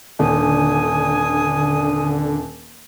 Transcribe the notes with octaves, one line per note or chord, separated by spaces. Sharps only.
D#1 D3 G#5 D#6